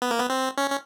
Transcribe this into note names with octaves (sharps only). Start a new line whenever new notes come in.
B3
A#3
B3
C4
C#4
C#4